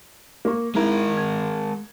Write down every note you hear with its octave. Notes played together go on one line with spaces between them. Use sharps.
A#3 C#6
G#3 D#4 E4 G#4 A#4
G#6